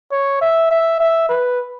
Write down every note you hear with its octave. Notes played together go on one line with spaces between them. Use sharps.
C#5
E5
E5
E5
B4